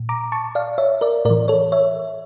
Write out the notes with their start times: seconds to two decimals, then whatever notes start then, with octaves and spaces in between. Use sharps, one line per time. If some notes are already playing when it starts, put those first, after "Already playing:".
Already playing: A#2
0.09 A#5 D6
0.32 A5 C#6
0.55 D5 F5
0.78 C#5 E5
1.01 A#4 D5
1.25 A2 A#4 D5
1.30 E3
1.48 A4 C#5
1.72 C#5 E5